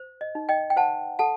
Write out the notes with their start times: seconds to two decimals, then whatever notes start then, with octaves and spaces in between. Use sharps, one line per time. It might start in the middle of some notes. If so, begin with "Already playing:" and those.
Already playing: C5
0.21 D#5
0.35 D#4
0.49 D#5 G5
0.70 G5
0.76 C5 F#5 A5
1.19 A4 F#5 A5